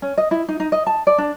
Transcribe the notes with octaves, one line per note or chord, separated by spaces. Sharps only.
C#4
D#5
E4
D#4
D#4
D#5
A5
D5
D4